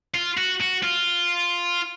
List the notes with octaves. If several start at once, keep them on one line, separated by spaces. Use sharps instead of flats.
F4
F#4
F#4
F4